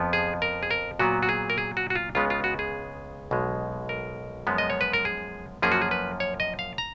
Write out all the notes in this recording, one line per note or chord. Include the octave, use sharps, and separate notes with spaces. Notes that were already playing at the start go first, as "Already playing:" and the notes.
Already playing: F2 F3 B3
G#4
A#4
G#4
A#4
A#2 F#3 B3 F#4
F#4
G#4
A#4
G#4
F#4
F#4
F4
C#2 C#3 G#3 B3 F4
F4
F#4
G#4
B1 B2 G#3
A#4
F#2 F3 G#3 B3
D#5
C#5
B4
A#4
G#4
F#2 F3 A#3 C#4 G#4
F#4
G#4
B4
C#5
D#5
F5
A#5